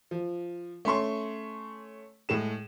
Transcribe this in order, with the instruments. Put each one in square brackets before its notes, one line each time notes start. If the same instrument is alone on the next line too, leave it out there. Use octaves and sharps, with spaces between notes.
[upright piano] F3
A3 C#4 C6 C#6
A2 G#3 E7